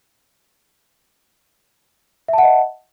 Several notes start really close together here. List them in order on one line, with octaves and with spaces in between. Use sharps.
E5 A5 F#5 D#5